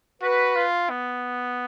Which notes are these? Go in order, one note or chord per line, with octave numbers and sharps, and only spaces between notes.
F#4 B4
F4
B3